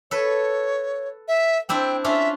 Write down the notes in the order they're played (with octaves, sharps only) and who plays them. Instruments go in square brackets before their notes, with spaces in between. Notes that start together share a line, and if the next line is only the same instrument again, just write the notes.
[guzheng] A4 B4 [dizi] C#5
[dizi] E5
[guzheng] C4 D4 E4 [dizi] G5
[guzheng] C#4 D4 F4 [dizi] E5